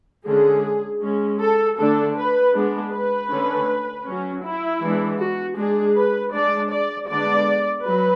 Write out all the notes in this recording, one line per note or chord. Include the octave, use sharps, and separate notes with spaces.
D3 G#3 C#4 G#4
G#3 C#4
A4
D3 A3 D4 A4
B4
G#3 B3 D4
B4
D3 A3 C#4
F#3 C#4
E4
E3 G#3 B3 D4
F#4
G#3 D4 G#4
B4
G#3 D4 D5
D5
D3 G#3 B3 D4 D5
F#3 B4